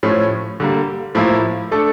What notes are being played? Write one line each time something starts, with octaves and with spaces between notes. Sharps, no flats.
A2 F3 C#4
D3 G3 A#3
A2 F3 A#3 E4
A3 D4 A4